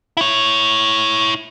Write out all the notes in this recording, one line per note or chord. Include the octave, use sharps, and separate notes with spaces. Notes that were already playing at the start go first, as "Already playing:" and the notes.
E4 C#5